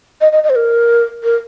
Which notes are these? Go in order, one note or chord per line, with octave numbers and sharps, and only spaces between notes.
D#5
D#5
D#5
C5
A#4
A#4